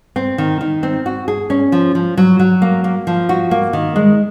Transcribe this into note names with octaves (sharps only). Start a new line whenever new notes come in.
C4
D#3
D#3
C4
F#4
G#4
C#4
F3
F3
F#3
F#3
A#3
A#3
F3
F#4
A#3
D#3
G#3